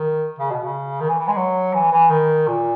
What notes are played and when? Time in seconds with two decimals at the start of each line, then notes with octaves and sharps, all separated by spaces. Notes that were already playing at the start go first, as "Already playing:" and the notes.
Already playing: D#3
0.39 C#3
0.51 B2
0.63 C#3
1.00 D#3
1.09 E3
1.19 E3
1.28 G#3
1.37 F#3
1.74 E3
1.92 E3
2.10 D#3
2.48 A#2